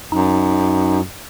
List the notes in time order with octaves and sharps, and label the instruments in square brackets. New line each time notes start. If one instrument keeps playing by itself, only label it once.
[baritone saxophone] F#2 [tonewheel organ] D#4